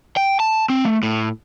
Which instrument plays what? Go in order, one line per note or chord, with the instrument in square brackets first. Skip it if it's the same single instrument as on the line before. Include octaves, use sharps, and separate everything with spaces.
[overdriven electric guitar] G5
A5
C4
A3
A2